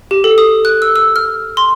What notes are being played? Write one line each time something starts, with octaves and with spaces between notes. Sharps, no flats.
G4
A4
D#6
F#6
E6
E6
F6
C6